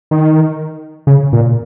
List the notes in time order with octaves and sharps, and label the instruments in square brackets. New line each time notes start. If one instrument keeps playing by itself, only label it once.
[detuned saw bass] D#3
C#3
A#2